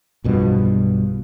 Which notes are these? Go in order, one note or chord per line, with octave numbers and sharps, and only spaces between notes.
B1 G2 B2 F3